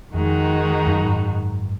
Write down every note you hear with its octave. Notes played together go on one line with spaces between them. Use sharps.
F2 D#3 G#3 D#4 F#4
F#2
G#2